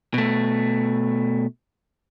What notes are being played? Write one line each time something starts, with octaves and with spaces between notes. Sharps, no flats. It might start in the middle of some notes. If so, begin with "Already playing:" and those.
B2 A3